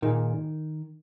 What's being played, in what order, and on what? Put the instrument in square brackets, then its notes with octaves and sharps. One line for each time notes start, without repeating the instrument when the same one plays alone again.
[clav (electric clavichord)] A#2 A#3 D#4 G#4 [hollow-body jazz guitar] D#3